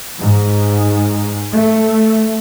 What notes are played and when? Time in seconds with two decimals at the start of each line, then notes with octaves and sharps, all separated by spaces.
0.20 G#2
1.52 A3